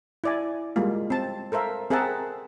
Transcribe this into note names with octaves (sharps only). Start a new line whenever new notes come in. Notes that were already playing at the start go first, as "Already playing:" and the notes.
E4 D5 G#5
G3 G#3 A#3 F4
C4 A5
A4 A#4 C5 E5 F5
C4 G#4 A#4 E5 F#5 A5